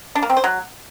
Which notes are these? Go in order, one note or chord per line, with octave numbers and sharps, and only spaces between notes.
D4
A#3
C4
C5
F#3